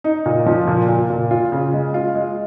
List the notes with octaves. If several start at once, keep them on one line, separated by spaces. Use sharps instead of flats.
D#4
A#2
F3
A#2
A#2
A#2
F4
C#3
G#3
F4
G#3